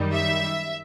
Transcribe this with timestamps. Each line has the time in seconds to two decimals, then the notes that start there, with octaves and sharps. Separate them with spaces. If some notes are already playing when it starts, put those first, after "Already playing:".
Already playing: F#2 D#3 G3
0.13 E5